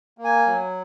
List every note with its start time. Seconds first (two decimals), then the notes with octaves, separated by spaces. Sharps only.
0.18 A#3
0.24 G#5
0.47 F#3